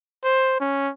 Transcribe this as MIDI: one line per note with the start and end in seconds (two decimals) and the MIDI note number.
0.24 0.57 72
0.61 0.89 61